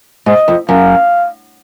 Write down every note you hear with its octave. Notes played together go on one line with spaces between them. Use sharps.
G#2 D#5
F2
F#2 F5